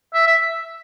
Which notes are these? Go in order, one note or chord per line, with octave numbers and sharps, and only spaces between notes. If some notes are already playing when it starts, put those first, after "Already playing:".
E5
E5